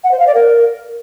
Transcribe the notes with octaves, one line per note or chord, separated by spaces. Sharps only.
F#5
C5
F5
D5
A#4